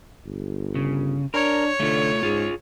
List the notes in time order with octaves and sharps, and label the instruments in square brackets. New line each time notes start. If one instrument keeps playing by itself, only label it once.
[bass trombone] G1
[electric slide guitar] C#3
[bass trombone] D4 [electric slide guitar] A#4 [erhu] C#5
[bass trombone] D3 [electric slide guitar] A3 F4
[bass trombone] G#2 [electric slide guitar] F4 G#4